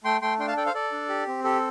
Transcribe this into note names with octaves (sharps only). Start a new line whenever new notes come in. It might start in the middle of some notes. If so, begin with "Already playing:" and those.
A3 G5 C6
A3 G5 C6
D4 G5 C6
F5 A5
A4 D5 G5
C5 F5
A4 D5
D4
G4
C4
G4 A4